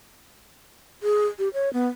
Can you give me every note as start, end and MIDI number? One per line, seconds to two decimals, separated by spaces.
1.03 1.26 68
1.39 1.49 67
1.54 1.72 73
1.73 1.88 59